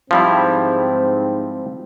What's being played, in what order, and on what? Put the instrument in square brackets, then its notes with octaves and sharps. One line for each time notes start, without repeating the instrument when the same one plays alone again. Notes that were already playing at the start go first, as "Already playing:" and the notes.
[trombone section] G#2 C4 [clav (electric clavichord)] F3 G3 E4